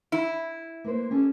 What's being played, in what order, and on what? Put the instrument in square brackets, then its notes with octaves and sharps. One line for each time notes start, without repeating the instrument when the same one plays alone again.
[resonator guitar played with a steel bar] E4
[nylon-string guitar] A#3 B4 C5
C#4 G4 A4